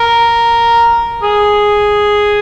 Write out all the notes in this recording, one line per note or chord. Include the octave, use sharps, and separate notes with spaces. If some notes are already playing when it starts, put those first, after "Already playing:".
Already playing: A#4
G#4